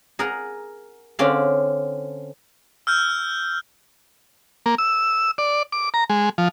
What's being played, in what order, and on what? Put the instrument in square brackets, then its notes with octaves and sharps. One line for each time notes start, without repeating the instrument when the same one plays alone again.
[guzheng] G#4 A#4 F#5 A#5
D3 C4 C#4 D5 F5
[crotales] E6 F6 G6
[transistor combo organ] A#3
E6
D5
D6
A#5
G#3
F3